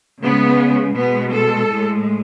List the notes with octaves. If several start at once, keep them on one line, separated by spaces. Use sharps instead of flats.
C#3 G#3 B3
B2 G#3 B3
A4
A2 G#3